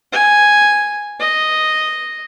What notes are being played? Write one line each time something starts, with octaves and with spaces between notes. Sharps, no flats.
G#5
D#5